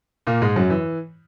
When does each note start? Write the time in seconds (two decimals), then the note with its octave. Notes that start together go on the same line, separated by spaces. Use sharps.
0.27 A#2 A#3
0.42 G#2 G#3
0.56 F#2 F#3
0.70 E3